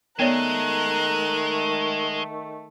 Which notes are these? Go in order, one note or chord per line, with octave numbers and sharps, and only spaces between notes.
D#3 G#3 A3 B3 C#5 D5 A#5 F#6